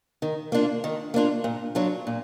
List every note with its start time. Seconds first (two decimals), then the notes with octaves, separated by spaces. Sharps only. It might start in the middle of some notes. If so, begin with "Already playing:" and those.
0.22 D#3
0.52 A#3 D4 F4
0.84 D#3
1.14 A#3 D4 F4
1.44 A#2
1.75 F#3 D4 F4
2.07 A#2